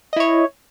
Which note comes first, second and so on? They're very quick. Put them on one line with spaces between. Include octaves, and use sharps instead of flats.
D#5 E4 C#5